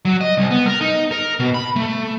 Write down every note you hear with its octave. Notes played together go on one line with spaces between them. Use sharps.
F#3
D#5
C2
B3
A#4
D#4
A#4
B2
B5
A3